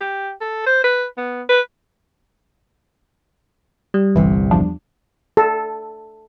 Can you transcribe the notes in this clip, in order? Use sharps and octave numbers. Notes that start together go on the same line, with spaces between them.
G4
A4
C5
B4
B3
B4
G3
G1 C2 C3 E3
E2 F3 D4
A4